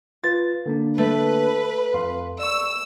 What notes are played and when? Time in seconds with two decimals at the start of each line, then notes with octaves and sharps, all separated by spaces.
0.24 F4 B4 A6
0.66 D3 A#3 D4
0.98 A3 B4
1.94 F2 F5 C6
2.39 D5 C#6 E6